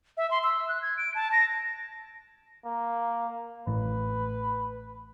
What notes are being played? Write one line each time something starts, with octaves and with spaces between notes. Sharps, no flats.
E5
C6
E6
F#6
G#6
D7
A5
A#6
A#3
A1 A2 B4